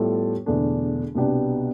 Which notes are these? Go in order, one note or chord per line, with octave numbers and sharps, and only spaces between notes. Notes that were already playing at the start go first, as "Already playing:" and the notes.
Already playing: A2 G3 B3 F4 A4
E1 E2 D3 A3 D4
C2 B2 B3 D4 G4